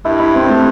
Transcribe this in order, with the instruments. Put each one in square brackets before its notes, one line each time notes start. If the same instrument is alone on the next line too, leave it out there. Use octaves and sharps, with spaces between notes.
[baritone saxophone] G2 [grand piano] E4
[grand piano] E4
C4
A3